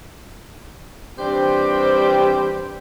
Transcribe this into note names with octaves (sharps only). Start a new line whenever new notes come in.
E3 G3 C4 D4 G4 C5